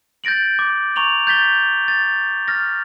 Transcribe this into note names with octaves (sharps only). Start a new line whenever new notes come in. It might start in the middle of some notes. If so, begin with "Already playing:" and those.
G6 A6 A#6 D7 F#7
D6
A#5 C#6 D6 F7 F#7
G6 A6 B6 G7
A6
F6 A6 A#6